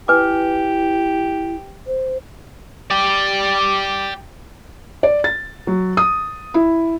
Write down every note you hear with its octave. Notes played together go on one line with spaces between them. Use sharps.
E4 G4 B4 G#5 D6
C5
G4 D5
D5
A6
F#3
D#6
E4